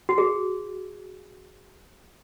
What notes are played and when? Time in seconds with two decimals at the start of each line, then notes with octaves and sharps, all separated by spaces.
0.09 F#4
0.18 G#4